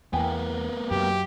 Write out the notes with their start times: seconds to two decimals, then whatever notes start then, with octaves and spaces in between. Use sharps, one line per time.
0.13 E2 A#3 B3 G5 G#5
0.91 F#2 G4